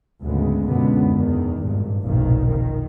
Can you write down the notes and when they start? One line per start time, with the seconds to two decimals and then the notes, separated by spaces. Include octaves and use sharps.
0.23 G#1 D2 C#3 G#3 B3
0.68 C#2 F#2 B2 D3 G#3 B3
1.10 E2 D#3
1.62 G#1 G2 A#2
2.03 F1 B1 F2 A#2 D#3
2.48 D#3